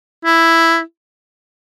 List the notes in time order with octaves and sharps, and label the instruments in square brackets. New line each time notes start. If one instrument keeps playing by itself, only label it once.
[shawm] E4